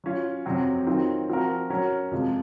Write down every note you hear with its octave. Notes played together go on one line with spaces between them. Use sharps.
F#3 C#4 F4
F2 C3 F#3 C4 F#4
D#3 F#3 C4 F4
F3 C4 F#4 A#4
F#3 C#4 F#4 A#4
F2 C3 F3 G#3